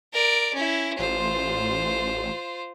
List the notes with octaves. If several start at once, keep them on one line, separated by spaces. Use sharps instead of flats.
A#4 D5
C#4 E4
A1 F4 C5